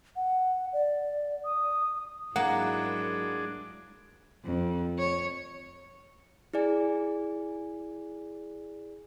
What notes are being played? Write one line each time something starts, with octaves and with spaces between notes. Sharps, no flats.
F#5
D5
D#6
G#2 F#3 G#3 A#3 D4 E4 F#5
F2
C#5
E4 G#4 D5 G#5